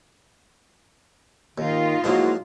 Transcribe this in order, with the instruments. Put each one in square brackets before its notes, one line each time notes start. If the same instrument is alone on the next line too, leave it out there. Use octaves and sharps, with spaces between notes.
[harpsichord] D#2 [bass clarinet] D#3 [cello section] D#4 F4
[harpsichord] G#2 F3 F#3 [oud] G#3 A#3 E4 [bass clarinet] F#4